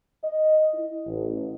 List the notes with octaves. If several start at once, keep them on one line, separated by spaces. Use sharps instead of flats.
D#5
E4
A1